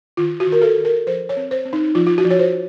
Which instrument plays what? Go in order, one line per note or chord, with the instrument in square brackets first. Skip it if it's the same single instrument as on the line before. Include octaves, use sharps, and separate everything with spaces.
[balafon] D#3 F4
F#4
D#3
A#4
A4
D#3
A#4
F3 C5
C#5
C4
C5
C4
D#4
F3 F4
F4
F#4
F3
C#5
C5